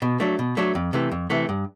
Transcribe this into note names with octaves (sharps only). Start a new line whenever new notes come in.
B2
F#3 A3 D4
B2
F#3 A3 D4
F2
C3 E3 A3
F2
C3 E3 A3
G2